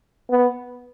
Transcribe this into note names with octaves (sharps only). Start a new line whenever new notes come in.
B3